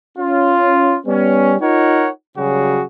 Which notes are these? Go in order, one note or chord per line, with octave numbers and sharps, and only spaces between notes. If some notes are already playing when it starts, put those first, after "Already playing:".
C#4 F4
G3 B3 C#4
D#4 F4 A#4 C#5 F#5
C#3 F#3 G3 F#4 G#4